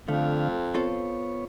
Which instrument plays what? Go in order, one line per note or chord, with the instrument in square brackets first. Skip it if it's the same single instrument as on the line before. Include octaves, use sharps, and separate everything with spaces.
[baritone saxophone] F2 [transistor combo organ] D3 F5 [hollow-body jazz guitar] A3
[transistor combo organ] B3 C#5 [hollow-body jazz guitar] C4 F4 A4